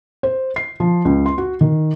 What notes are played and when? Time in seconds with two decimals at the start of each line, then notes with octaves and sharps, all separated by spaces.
0.23 C5
0.56 C7
0.80 F3
1.05 C#2
1.26 C6
1.38 F#4
1.61 D#3